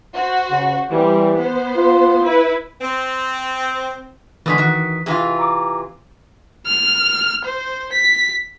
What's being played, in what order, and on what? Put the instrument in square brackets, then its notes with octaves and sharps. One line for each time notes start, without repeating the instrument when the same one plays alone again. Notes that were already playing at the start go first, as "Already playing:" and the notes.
[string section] F#4 C5
[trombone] C#3
[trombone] E3 [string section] G3 C4
[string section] B3 C5
[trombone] F4
[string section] E4 B4
[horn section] C4
[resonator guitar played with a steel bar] B2 D3 G#3 [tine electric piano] E3 D#6 B6
[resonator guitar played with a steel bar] D#3 F#4
[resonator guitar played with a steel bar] C3 E3 F4 [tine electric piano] G#4
[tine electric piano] A#5 D6
[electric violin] F6
C5
B6